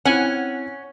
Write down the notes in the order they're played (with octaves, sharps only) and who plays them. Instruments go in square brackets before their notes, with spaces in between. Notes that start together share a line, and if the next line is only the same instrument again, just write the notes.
[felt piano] C4 E4 [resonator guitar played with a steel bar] C#4 [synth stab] F#5 G#5